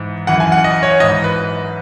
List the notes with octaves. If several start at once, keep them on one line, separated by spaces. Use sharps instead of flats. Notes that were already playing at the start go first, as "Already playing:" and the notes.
Already playing: G#2 E3
F#2 E3 F#5
G#5
F#5
D#5
C#5
G#2 E3 D#5
B4